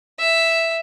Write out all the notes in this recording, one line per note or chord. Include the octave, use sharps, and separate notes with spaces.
E5